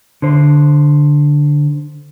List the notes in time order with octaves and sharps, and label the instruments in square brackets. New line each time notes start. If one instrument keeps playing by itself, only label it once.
[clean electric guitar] D3 C5